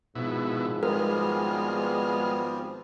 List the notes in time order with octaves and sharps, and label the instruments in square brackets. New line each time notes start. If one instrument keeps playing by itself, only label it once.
[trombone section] G#1 G#2 F3 [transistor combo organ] B2 E4
[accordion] G3 B3 C4 [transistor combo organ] G#3 F6 [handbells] A#4